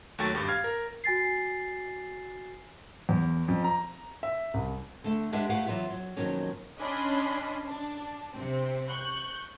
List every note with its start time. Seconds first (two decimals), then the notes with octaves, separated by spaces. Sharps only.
0.18 D#2 F#3 A3 G5 C#6 A6
0.35 G#1 G2 G4
0.48 F5 F6 G#6
0.64 A#4
1.04 F#4 G#5 A6 C7
3.09 E2
3.48 F2
3.64 A#5
4.23 E5
4.54 C2
5.04 D3 A3 A4
5.32 G#3 D4 G4 B4 E5 F#5
5.49 A3 E4 G4 B4 F5 F#5
5.67 E3 F#3 B3 F4 E5
5.90 F#3
6.17 F2 B2 D#3 F#3 A#3 C#4
6.78 C#4 D4 D#5 G#5 B5 C6
7.66 D4
8.33 C3 C4
8.89 C#6 F#6 G6